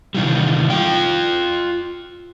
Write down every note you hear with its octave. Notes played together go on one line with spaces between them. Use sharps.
C3 D#3 E3 G3
F4 G5